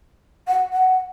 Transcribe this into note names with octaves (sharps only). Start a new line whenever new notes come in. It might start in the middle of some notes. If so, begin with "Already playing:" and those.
F#5
F#5